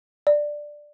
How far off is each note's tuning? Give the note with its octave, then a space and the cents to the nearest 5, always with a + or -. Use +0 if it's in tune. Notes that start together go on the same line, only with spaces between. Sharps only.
D5 +10